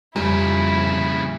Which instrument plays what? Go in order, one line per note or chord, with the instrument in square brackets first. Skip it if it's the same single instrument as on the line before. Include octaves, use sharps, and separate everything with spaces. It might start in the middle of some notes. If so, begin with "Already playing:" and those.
[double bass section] F2 [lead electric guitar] A#2 C#3 [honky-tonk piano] G3 [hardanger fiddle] E4